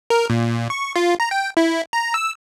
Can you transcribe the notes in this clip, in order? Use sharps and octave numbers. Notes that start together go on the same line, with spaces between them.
A#4
A#2
C#6
F4
A#5
G5
E4
A#5
E6